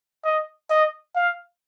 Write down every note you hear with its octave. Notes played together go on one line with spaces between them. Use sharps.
D#5
D#5
F5